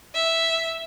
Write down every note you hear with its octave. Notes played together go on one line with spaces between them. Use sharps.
E5